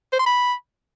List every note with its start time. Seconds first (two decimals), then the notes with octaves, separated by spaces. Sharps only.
0.13 C5
0.19 C6
0.26 B5